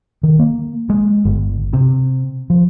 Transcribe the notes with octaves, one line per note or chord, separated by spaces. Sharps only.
D#3
A#3
G#3
G1
C3
F3